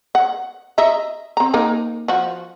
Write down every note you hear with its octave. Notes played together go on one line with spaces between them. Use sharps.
F#5
D#5 E5 A#5
C4 A#5
A#3 D#4 A#4
F3 F#4